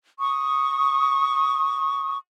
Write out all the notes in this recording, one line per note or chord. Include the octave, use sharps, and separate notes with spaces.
C#6 D#6